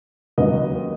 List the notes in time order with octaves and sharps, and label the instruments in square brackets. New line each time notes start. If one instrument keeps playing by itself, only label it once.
[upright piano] D#2 C#3 F#3 A#3 B4 D#5